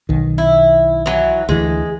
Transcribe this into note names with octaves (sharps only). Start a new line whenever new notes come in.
B1 D#3
E4
E3 F#3
D2 E3 G#3